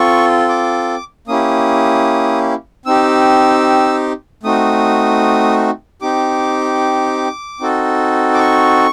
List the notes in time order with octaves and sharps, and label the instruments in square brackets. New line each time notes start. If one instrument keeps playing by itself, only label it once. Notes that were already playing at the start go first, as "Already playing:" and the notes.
Already playing: [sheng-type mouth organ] C4 F4 A4 C#6
D6
A#3 C#4 E4 G4 D#6
C4 D#4 G4 E6
A3 C4 D#4 F#4 D#6
C4 D#4 G4 D6
C4 D#4 F#4 A4
D6
C#6